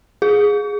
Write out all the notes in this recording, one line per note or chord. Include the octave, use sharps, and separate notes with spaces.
G#4